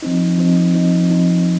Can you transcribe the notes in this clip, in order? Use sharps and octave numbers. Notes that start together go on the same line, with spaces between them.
F3 C4 D#4
F3 C4 D#4
F3 C4 D#4
F3 C4 D#4